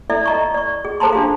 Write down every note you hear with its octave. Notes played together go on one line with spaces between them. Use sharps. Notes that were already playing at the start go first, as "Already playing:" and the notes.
E4 A4 D5 E5
D#5 A#5 C#6
D5 C#6
G#4
G#4 A4 C5 A5 A#5 C6
D4 G4 F5